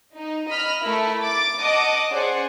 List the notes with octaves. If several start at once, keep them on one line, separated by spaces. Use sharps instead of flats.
D#4
D#5 B5 F6
A3 E4 A#4 B5
D6 A6
D#5 F#5 A5 D6 D#6
C#4 G#4 C5 D5 F#5